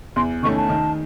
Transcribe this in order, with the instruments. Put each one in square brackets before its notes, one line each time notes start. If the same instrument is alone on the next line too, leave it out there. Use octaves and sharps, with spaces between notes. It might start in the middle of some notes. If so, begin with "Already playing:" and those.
[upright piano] E2 [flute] C6
[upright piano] D#3 A3 C#4 [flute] C#6
[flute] A5
[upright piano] D#3